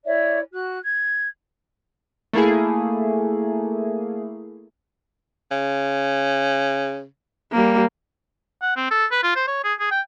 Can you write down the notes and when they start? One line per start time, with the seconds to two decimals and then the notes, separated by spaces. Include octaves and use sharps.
0.05 E4 C#5 D5 E5
0.53 F#4 F#6
0.83 G#6
2.33 A3 A#3 E4 G#4
5.52 C#3
7.52 G3 A#3
8.62 F#5
8.77 C4
8.91 A4
9.11 B4
9.23 F4
9.36 C5
9.47 C#5
9.64 G#4
9.80 G#4
9.91 G5